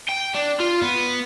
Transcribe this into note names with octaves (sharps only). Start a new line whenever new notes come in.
G5
D4
F4
B3